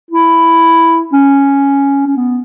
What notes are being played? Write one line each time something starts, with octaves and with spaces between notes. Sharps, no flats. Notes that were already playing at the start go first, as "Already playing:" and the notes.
E4
C#4
C#4
B3